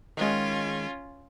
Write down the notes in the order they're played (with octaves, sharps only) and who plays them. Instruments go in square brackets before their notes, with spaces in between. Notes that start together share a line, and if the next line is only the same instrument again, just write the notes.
[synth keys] D#3 G#3 [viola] C#4 F4